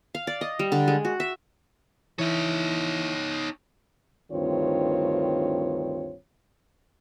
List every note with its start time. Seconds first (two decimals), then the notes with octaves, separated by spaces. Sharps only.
0.15 F5
0.27 D5
0.41 D#5
0.59 G3
0.72 D3
0.88 G#3
1.05 F#4
1.20 E5
2.19 E3 D#4 E4 C#5
4.31 D2 G2 D#3 C4 F4 C#5